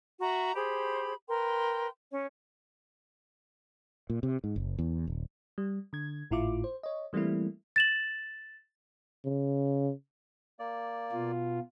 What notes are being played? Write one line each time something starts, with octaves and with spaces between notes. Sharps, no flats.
F#4 E5 A#5 C#6
G4 G#4 C5 B5
A#4 B4 G5 C6
C#4 C#5
A#2
C3
G#2
F#1
E2
D#1
G3
D3 G#6
G#1 A2 E4 F4 D6
C5
C#5 D#5
E3 G3 A3 A#3 C4 E4
A6 E7 F#7
C#3
A#3 D5
B2 F4